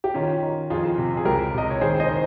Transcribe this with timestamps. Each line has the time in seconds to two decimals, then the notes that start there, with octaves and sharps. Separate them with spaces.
0.04 G4
0.14 D#3 C#4 F4
0.43 D#3
0.70 F2 F4 G#4
0.98 C3
1.17 G#4
1.25 C#2 G4 A#4
1.54 C3 D#5
1.70 C#5
1.81 D#3 G#4 C5
2.00 C5 D#5
2.08 D#3